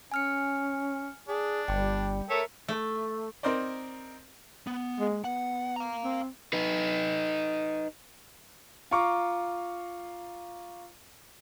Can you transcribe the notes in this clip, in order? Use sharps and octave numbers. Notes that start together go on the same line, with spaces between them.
C#4 G#5 F6 C#7
D4 G#4
G1 G3 G5
A3 A#4 C#5 E5
A3
C4 D#4 A#4 C5 D5
B3
G#3
B3 F#5
F5 A#5
C4
D#4 B4
F4 F5 A#5 C#6 D6